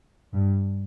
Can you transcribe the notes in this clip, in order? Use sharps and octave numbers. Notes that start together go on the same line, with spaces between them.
G2